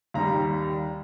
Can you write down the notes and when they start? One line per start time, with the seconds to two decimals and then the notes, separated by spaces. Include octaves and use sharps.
0.14 D#2 D#3 G3 A#5